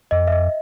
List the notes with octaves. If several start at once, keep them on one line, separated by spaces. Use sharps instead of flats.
F2 D#5
E5
D#5